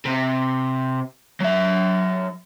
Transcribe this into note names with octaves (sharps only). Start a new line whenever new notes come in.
C3
F#3 E5